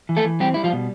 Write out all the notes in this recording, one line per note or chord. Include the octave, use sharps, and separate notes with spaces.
E3
A3 A4
E3
G3 C4 G4
G3 E4
F3 F4
B2